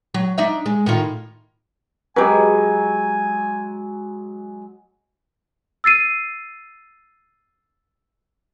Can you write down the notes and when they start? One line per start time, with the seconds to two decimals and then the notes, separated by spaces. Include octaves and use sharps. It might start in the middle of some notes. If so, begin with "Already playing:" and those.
0.14 F#3
0.38 D4 D#4 E5
0.66 G#3
0.86 A2 D#3 F4
2.16 F#3 G#3 G4 B4 G#5
5.84 E6 A6 C7 D#7